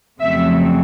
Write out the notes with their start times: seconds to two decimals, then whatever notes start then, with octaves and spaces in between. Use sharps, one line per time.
0.20 F2 C#3 F#3 A3 C4 E5